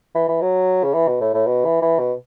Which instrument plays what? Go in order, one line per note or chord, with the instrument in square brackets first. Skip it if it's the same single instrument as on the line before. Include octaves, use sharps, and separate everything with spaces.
[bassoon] E3
E3
F#3
C#3
E3
B2
A2
A2
B2
E3
E3
B2